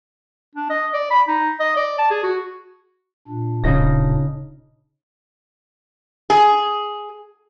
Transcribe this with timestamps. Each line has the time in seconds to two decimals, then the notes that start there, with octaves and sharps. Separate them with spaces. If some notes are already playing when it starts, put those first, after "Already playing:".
0.55 D4
0.70 D#5
0.93 D5
1.10 B5
1.28 D#4
1.60 D#5
1.76 D5
1.99 A5
2.10 G#4
2.23 F#4
3.28 A#2 D4
3.64 D1 C#3 D#4 A#6
6.30 G#4